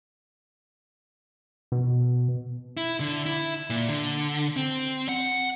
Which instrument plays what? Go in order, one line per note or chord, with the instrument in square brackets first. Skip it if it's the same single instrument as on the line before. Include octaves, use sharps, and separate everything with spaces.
[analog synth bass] B2
[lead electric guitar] E4
D3
E4
A#2
D3
C4
F#5